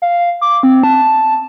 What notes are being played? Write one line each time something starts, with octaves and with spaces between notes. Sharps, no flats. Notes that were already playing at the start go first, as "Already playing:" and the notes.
F5
D6
C4
A5